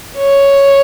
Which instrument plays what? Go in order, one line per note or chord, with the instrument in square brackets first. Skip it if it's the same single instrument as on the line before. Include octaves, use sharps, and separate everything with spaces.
[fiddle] C#5